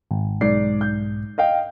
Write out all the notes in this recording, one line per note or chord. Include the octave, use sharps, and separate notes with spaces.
G#1
B1 G#2 D5 C7
G6
D#5 F5 G5